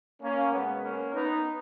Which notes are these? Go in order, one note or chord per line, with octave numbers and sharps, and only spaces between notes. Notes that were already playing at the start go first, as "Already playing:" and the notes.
A#3 C#4
B2 G#3 B3
A#3 C#4
B3 D#4